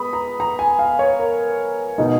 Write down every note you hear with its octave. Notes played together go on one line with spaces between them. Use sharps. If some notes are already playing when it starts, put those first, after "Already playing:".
Already playing: G#3 B3 B5 D#6
A#5
A#5
G#5
F5
C#5
A#4
B2 G#3 D#4